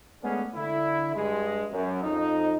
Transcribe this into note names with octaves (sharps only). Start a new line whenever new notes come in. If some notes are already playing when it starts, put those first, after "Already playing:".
G#3 A3 B3 C#4 D4 G#4
D3 E4
G2 G#3
F#2
F2 D#4